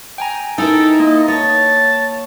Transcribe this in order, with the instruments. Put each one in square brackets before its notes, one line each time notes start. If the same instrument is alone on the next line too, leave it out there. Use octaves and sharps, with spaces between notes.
[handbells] G5 G#5 A#5
[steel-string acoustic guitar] D#4 E4 A#4 [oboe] A4
[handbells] A#3 [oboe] D#5
[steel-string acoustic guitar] C#5 [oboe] A5